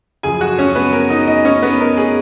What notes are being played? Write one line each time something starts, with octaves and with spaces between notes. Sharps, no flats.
F#2 C#3 F3 G#4 G#5
F#4 F#5
C#4 C#5
B3 B4
A#4
D#4 D#5
D#4 D#5
C#4 C#5
B3 B4
A#4
G#4